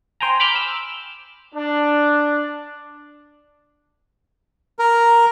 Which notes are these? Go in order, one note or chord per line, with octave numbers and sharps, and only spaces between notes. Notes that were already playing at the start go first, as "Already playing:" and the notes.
C5 G5 G#5 A#5
B5 D6 F6 G6
E6
D4
A#4